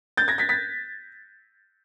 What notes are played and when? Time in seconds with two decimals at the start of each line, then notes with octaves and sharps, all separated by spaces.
0.17 G6 A6
0.28 G#6 A#6
0.38 A6 B6
0.49 A6 B6